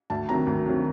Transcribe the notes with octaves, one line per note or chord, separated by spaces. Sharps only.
D2 A5
C3 D#3 F#3 A#5
D2
C3 D#3 F#3